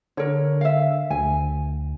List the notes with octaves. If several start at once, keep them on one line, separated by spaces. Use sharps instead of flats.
D3 A#4 C#5
E5 F5
D2 G#5